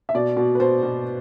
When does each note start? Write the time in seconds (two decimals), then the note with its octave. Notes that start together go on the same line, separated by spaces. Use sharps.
0.09 E5
0.15 B2 D5
0.37 B2
0.55 B4
0.60 B2 C5
0.83 B2